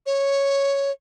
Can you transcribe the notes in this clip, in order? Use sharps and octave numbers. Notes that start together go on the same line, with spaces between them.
C#5